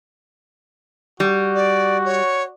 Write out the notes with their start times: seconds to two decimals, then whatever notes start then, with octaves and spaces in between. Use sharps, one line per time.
1.20 G3 F#4
1.55 D5
2.05 C#5